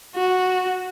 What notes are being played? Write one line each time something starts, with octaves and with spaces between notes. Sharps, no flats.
F#4